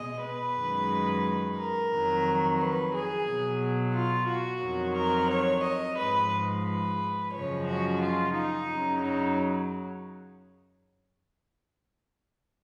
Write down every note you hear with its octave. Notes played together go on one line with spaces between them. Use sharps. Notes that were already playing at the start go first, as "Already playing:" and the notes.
Already playing: B2 G#3 D#5
B4
F#2 D#3 G#3
A#4
F2 D#3 F#3
B4
G#4
B2 F#3
F4
F#4
F2 D#3 F#3
A#4
C#5
D#5
G#2 F3 G#3 B4
B4
F#2 C#3 F3 G#3 C#5
F#4
F4
D#4
F#2 C#3 F#3
D#4